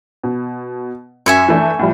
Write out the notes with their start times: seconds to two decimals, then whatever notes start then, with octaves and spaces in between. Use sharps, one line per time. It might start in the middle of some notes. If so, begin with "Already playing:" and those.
0.23 B2
1.26 F#2 E5 G#5 C#6
1.48 E3 A3 D4
1.79 A2 F3 G3